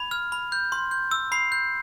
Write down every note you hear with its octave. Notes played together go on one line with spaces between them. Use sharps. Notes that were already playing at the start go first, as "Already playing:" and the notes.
Already playing: B5 G#6
F6
B5
G6
C6
G6
E6
B5 C7
G6